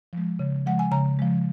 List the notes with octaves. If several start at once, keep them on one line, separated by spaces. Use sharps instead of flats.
F3 G#3
C#3
F3 G#3 F#5
G#5
C#3 A#5
F3 G#3